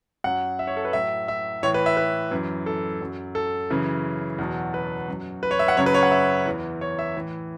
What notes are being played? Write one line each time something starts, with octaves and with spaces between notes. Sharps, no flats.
F#2 F#3 F#5
E5
C#5
A4
B4
A2 F#3 E5
E5
A2 E3 C#5
B4
E5
B4
F#2 E3
A4
F#2 F#3
A4
F#2 C#3 E3
E2 B2 F#3
B4
F#2 F#3
B4
C#5
E5
F#5
F#2 C#3 F#3 C#5
B4
C#5
F#5
E5
E2 E3
C#5
E5
A2 E3